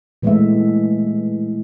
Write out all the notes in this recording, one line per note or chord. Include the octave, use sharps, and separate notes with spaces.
A#2 E3 G#3 A3 B3 E5